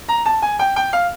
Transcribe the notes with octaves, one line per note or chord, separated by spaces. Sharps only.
A#5
A5
G#5
G5
G5
F5